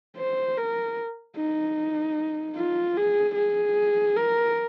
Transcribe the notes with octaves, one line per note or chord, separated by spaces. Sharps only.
C5
A#4
D#4
F4
G#4
G#4
A#4